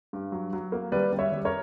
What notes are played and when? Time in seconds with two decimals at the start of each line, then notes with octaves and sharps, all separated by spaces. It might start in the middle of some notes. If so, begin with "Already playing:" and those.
0.13 G2
0.32 F#3
0.53 F#3
0.72 A#3
0.92 G3 B4 D5
1.13 G3
1.19 C#5 E5
1.32 G3
1.45 A#4 C#5